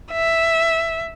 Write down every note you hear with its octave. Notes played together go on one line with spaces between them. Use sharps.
E5